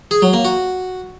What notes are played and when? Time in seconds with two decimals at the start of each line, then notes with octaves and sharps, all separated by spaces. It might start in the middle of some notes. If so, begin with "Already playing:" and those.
0.11 G#4
0.22 F#3
0.33 A#3
0.45 F#4